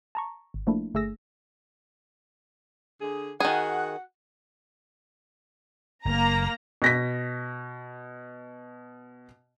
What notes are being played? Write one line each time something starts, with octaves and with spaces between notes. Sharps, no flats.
A5 A#5 C#6
G#1
F3 A3 A#3 D4 E4
G1 A3 G#4 E6 A#6
D3 G#4
D#3 F#4 G#4 F#5
F#1 A#3 A#5
B2 A#6 B6